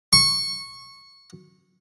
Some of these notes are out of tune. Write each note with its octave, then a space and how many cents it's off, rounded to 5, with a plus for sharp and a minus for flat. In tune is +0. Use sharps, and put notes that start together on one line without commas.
C#6 -15